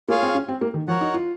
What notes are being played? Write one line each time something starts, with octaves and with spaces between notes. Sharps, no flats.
A#3 F4 G#4 C#5 F5
C4
C#4
C4
A#3
D#3
F3 F#4 A#4 C#5 F#5
D#4
F4